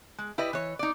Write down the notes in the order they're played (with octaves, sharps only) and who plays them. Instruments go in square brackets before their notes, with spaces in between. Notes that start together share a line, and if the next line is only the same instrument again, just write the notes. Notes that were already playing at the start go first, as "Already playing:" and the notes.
[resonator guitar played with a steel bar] G#3
E4 G4 B4 D5 D#5
E3 C#5
D#4 D5